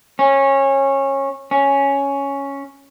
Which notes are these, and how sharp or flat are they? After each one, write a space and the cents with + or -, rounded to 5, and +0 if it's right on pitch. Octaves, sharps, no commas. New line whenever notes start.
C#4 -20
C#4 +5